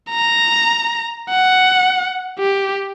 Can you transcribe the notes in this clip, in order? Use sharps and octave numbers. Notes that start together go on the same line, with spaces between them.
A#5
F#5
G4